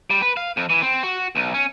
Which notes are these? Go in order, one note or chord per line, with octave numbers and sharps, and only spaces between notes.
G3
B4
F5
F2
E3
C4
F#4
B1
C#4